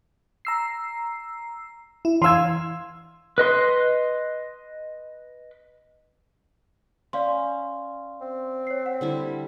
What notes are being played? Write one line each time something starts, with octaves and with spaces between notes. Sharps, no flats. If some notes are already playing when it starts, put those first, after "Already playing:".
A#5 E6 C7
E4
E3 F5 C6 E6 G#6
B4 D#5 C6
C#4 D5 F5 C6
C4
C#5 C7
F#5
D3 G3 E4